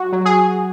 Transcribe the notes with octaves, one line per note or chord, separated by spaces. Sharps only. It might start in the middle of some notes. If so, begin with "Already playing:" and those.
Already playing: F#3 F#4
F#3
G#4